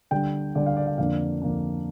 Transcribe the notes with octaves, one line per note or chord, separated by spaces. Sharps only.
D3 G3 D4 G5
D3 G3 D4 D5
F5
D5
F5
F2 D3 A#3 D4 F5
F2 D3 A#3 D4